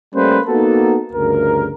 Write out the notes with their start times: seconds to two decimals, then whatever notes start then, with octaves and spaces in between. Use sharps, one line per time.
0.14 G3 A3 A#3 C#4 B4 C5
0.47 A#3 B3 D#4 F#4 A4
1.13 D2 G2 C#3 A#4